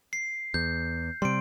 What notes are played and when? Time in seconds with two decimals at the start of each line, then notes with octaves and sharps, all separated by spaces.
0.13 C7
0.54 E2 G6
1.22 C3 G3 C6 D7